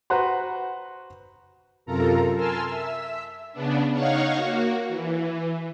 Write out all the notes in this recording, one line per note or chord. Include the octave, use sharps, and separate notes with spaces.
F#4 B4 C5 F#5 A#5 C6
F#2 C3 F4 A4 A#4 A#5
A#4 G#5 A5 C6 E6 F6
E5 E6
C#3 B3 D4
D#4 C#5 F5 F#5 C#6
A#3 F#4
E3